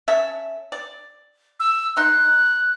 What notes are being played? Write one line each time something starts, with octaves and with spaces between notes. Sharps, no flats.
C#4 A4 E5
D5
E6
D#4 C6 F#6